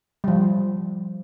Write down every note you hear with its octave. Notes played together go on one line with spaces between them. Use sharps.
F3 G3